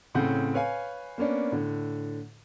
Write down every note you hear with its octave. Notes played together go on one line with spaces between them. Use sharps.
A2 C#3 C4 A4 F#5 G6
B4 C#5 F5 G#5
A#3 B3 C#4 D4
A2 D3